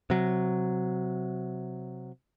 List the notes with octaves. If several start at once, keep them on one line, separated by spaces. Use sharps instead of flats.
C3 F#3